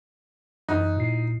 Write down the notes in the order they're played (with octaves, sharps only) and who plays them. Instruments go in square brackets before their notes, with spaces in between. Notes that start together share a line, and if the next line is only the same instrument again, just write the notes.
[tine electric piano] F#2 E3 F#6 [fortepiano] D#4
[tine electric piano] A#2 E4 C7